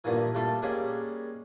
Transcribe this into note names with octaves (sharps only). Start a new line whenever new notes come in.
G2 A#2 D#3 E3
G3 A3 F4 A4
G3 G#3 A#3 C#4